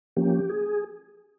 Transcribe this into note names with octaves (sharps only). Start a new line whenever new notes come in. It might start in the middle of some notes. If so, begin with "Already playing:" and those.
F3 A#3 C#4 G4
G#4